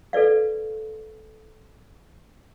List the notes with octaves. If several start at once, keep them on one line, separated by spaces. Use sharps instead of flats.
A4 B4 D5 F5